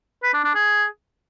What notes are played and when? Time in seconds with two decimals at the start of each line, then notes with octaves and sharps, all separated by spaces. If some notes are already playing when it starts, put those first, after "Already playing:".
0.23 B4
0.34 D4
0.44 D4
0.55 G#4